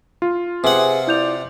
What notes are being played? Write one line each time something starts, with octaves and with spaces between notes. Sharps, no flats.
F4
C3 G#4 B4 F#5
E4 D5 G6 F7